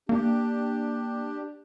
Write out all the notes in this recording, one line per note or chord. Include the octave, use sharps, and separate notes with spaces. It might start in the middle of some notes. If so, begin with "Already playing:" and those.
A#3 D4 G4